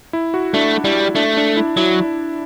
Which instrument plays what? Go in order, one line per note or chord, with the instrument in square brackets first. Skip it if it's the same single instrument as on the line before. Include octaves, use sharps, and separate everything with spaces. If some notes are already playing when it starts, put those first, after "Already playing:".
[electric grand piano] E4
F#4
[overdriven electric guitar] A3 [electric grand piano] D4
[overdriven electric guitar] G3 [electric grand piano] E4
[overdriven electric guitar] A3 [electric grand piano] D4
[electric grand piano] D4
E4
[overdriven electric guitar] F#3 [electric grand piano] E4